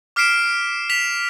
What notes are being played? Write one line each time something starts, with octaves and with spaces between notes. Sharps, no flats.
D6 F6 B6 C7 D7 E7
B6 F7